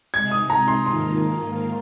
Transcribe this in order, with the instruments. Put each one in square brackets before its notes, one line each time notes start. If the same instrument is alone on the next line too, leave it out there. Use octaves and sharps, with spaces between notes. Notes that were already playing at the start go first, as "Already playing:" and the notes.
[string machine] C3 G#3 D#4 [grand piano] G#6
[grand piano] D#6
A#5
C6
[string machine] G#2 D#3 A#3 F4 [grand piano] C6